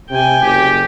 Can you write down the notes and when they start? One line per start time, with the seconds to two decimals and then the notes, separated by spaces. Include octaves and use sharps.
0.10 C3 G5 G#5
0.42 F#1 G4